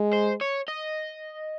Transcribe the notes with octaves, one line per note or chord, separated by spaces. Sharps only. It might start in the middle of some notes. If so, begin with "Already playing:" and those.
Already playing: G#3
C5
C#5
D#5